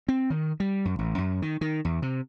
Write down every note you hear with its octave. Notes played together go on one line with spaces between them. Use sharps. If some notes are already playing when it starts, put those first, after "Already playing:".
C4
D#3
G3
F#2
A1
F#2
D#3
D#3
E2
C3